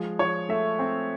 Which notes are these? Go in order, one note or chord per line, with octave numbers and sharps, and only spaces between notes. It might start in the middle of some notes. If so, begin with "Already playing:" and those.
Already playing: F3 G#3
F3 C#5
A3 E5
C4